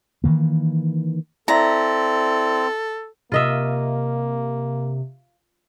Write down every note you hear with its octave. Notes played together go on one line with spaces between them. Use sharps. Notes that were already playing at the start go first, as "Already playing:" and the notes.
D#3 E3 A#3
C4 E4 A4 D5 E5 A#5
C3 A#3 F4 D#5 E5